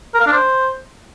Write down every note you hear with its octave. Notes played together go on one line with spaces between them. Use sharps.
A#4
F5
D4
C5